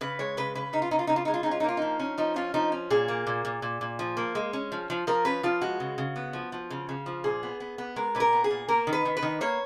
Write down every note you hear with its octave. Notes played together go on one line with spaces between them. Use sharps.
C#3 B4
G#3 C#5
C#3 B4
C#3 B4
C#3 D#4
F4
C#3 D#4
F4
C#3 D#4
F4
G#3 D#4
F4
C#4 D#4
F4
D#4
A#3 F4
F3 D#4
C#4
F3 D#4
C#4 F4
F3 D#4
C#4
A#2 G#4
A#3
A#2
A#2
A#2
A#2
F3
A#3
G#3
C#4
F3
F3
F3 A#4
C#4 B4
F3 F4
G#3 F#4
C#3
C#3
B3
F3
F3
C#3
C#3
F3
A#2 G#4
B3
B3
B3
G#3 A#4
A#2 B4
A#4
B3
G#4
A#2
A#3 A#4
D#3
B4
D#3
B4
D#3
A#3 C#5